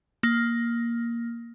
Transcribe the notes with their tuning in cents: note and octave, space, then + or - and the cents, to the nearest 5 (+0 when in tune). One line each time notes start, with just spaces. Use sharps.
A#3 +5